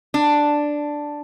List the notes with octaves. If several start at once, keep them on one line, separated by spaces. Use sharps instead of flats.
D4